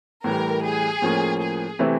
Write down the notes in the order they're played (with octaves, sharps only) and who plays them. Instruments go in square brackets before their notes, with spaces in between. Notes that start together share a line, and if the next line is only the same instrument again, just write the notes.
[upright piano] A2 E3 G3 [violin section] A#4
[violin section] G#4
[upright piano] A2 F3 A#3 C#4
[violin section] G#4
[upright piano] C3 E3 A3 C4 E4